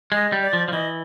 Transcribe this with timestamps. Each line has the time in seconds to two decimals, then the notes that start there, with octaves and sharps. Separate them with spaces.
0.12 G#3 D#5
0.32 G3
0.42 D5
0.53 F3
0.68 F3
0.73 E3 D#5